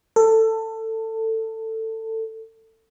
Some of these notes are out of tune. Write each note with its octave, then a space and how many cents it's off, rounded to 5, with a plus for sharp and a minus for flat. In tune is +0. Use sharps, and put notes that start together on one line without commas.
A4 +20